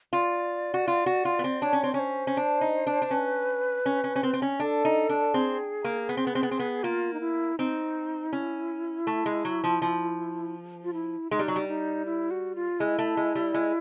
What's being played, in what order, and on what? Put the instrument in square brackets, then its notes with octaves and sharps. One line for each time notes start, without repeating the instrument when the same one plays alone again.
[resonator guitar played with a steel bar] F4 [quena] D5
[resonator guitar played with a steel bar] F#4
F4
F#4
F4
B3
C4
[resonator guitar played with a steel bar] D4 [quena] C#5
[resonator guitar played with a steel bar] C#4
C4
[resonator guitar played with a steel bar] C#4 [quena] C#5
[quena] C5
[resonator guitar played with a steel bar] C#4
D4
D#4
D4
D4
[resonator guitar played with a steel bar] C#4 [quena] B4
[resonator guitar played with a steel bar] C#4
C#4
C#4
C4
C4
C#4
[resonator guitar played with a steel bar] D4 [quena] A4
[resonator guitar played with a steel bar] D#4
D4
[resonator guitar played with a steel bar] C4 [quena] G#4
[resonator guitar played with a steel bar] A#3
B3
C4
B3
C4
B3
C4
B3
[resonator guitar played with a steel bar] A#3 [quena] F4
[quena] D#4
E4
[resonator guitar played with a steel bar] C4 [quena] D#4
[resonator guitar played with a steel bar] C#4 [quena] E4
[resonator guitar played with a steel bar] A3
G#3
F#3
F3
F3
[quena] F4
E4
[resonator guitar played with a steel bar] G#3 [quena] D#4
[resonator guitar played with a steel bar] G3
F#3
G3
[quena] D#4
E4
F#4
F4
[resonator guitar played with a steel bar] G#3 [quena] E4
[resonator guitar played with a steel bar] A3
G#3
G3
G#3